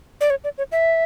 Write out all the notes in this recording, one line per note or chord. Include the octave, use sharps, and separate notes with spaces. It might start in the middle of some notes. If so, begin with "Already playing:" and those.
D5
C#5
D5
C#5
E5